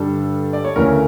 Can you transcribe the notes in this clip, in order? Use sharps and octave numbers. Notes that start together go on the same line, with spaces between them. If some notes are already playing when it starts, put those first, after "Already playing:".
Already playing: G2 D3 G3 D4 A4
D5
C#5
D2 C#3 E3 A3 C#4 A#4